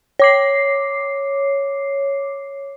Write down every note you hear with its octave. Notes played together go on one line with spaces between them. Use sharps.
C#5 D6 C7